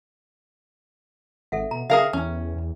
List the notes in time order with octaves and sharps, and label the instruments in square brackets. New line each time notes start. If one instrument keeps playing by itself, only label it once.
[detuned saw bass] G#1 [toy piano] A4 E5 F#5
[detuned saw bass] B2 [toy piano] A#5
[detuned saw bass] C#3 [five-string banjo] G#4 A#4 F5 [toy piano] E5 G5 A#5
[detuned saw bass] E2 [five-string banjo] C#4
[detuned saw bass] E2